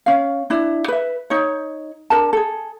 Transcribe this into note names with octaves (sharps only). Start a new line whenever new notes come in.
C#4 F5
D4 E4
B4 E5
D#4 C#5
D4 A#4 A5
G#4 A4